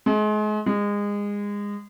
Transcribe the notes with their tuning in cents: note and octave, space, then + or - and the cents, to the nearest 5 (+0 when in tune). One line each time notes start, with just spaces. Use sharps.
G#3 +35
G#3 -25